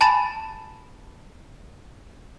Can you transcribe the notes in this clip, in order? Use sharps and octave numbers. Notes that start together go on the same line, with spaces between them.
G#5 A5 B5 A6 E7